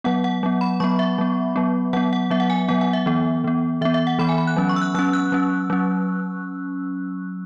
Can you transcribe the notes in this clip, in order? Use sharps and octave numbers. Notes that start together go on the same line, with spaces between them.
F#3 B3 F#5
F#5
F#3 B3
B5
F#3 B3 C#6
E5
F#3 B3
F#3 B3
F#3 B3 F#5
F#5
F#3 B3 E5
F#5
G#5
F#3 B3 F#5
F#5
E5
E3 B3
E3 B3
E3 B3 E5
E5
F#5
E3 B3 B5
G#5
B5
F#6
F#3 C#4
C#6
E6
F#6
F#3 C#4 E6
F#6
F#3 C#4
F#3 C#4